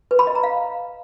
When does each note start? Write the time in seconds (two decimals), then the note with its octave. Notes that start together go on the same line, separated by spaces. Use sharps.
0.11 B4
0.19 B5
0.27 D#5
0.35 A#5
0.43 F5